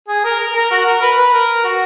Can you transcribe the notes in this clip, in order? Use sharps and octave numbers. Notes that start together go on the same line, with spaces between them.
G#4
A#4
A#4
A#4
F#4
A#4
B4
B4
A#4
F#4